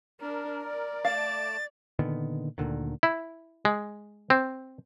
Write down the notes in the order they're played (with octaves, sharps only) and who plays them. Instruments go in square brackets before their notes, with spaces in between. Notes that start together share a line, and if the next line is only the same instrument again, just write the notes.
[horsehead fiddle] D4 [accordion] A#4
[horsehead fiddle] D5
[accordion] A3 A5 D6 [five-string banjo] F5 [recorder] A6
[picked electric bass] A#2 D3 D#3 B3
D2 A#2 D3 D#3
[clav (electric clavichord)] E4
G#3
C4